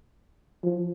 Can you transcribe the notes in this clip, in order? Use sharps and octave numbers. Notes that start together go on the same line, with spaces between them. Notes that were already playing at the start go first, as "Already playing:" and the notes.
F3